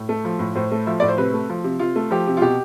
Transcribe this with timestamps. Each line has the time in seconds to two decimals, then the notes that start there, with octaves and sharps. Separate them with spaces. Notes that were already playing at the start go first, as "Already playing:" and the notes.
Already playing: A2
0.09 A3
0.25 F3
0.39 A2
0.55 A2 C5
0.72 A3
0.87 F3 E5
1.00 A2 D5
1.08 C5
1.18 C3 B4
1.33 A3
1.49 F3
1.64 C3
1.79 C3 F4
1.96 A3
2.11 F3 G4
2.27 C3
2.37 F4
2.42 B2 G4